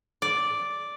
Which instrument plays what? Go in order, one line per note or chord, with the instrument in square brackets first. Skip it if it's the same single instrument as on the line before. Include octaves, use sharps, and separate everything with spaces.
[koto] D5